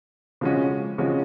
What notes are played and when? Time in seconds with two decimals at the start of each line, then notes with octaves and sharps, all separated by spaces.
0.41 C#3 F3 G#3 C#4 F#4
0.98 C#3 F3 G#3 C#4 F#4